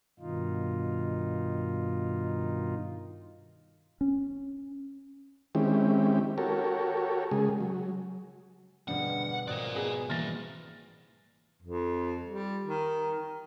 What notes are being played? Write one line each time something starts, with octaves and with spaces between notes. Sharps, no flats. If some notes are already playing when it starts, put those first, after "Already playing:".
G2 B2 D#3 D#4 F4
C#4
D#3 G#3 C4 C#4 E4 G4
F#4 G4 A4 A#4 C#5
C#3 G#3 G#4
F#3
E1 G2 B2 D3 F3 G3 F#5
G#1 A#4 D5 D#5 D#6 F#6
B3 G#4
E3 G3 A#3 F6 A6 A#6
F2
G3
D#3